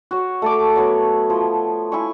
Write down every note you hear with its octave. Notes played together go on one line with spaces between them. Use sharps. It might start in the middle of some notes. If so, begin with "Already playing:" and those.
F#4 C#5
A3 A5 D6
F#3 B3 C#5
F3
E4 G#5 C#6